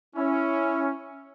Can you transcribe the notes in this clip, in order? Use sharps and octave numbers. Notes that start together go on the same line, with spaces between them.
C#4 E4